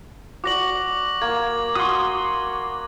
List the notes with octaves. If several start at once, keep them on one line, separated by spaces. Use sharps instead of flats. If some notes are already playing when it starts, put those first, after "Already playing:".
F#4 D5 D6 A#6 F#7
A#3 G#6
F#4 C6 D#6